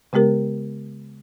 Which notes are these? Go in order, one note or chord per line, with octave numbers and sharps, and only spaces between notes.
C#3 G#3 B3 G4 A#4